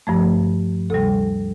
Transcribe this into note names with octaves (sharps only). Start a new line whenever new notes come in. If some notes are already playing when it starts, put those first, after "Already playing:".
G2 F3 A3
D2 C3 G3 A4